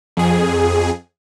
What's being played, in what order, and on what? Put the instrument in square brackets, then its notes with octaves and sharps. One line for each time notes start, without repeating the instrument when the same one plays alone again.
[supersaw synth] F2 G#4